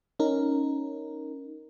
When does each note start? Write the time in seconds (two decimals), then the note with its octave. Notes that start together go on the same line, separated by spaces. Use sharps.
0.19 C#4 D#4 A#4